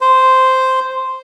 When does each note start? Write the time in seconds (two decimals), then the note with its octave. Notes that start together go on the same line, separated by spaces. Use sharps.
0.01 C5